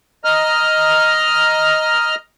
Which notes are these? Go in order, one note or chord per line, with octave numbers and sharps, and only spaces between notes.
D#5 A#5 F6